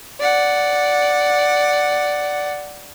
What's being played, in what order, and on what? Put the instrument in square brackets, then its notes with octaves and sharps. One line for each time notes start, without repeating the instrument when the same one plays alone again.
[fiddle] D5 F#5